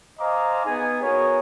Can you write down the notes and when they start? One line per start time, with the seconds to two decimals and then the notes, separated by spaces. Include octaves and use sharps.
0.19 C5 D#5 F5 G#5 A#5 D6
0.65 B3 D#4 G#4 G#5
1.02 B3 F#4 G#4 A#4 C#5